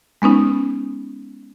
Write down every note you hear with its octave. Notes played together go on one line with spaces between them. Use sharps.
G#3 B3 C#4 D#4